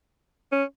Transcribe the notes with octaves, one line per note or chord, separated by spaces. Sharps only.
C#4